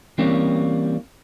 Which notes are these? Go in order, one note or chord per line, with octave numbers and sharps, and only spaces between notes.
E3 G3 A#3 C4 C#4